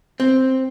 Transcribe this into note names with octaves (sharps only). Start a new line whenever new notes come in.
C4